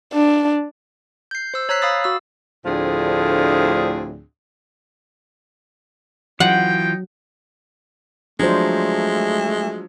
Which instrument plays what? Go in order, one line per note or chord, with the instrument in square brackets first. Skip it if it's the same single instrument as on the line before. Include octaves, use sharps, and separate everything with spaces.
[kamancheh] D4
[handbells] G6 C7
C5 E6
C#5 A#5 E6 F#6 B6 C7
F5 B5 D#6 E6 A6
F#4 E6
[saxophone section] D2 A2 F3 C4 D4 G#4
[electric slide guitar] E3 F4 [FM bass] F#3 [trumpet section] C#4 D#4 G5 [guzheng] F#5
[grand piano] F3 F#3 [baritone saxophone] G#3 [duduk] A3 [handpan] D4 C5